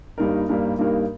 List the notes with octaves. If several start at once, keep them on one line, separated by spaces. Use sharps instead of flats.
G2 G3 A#3 D#4 A#4
G2 G3 A#3 D#4 A#4
G2 G3 A#3 D#4 A#4